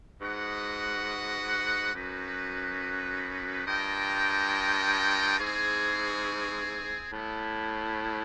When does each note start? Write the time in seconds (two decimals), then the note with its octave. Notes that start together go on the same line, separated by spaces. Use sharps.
0.21 G#2 F#4 B4 D#5 F#5
1.94 F#2 D#4 F#4 B4
3.66 G2 F4 A#4 D#5 G5
5.39 G#2 C4 E4 G#4
7.11 A2 G3 B3 E4